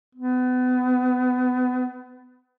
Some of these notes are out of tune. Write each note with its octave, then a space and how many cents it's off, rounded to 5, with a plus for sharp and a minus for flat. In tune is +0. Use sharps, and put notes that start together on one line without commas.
B3 +30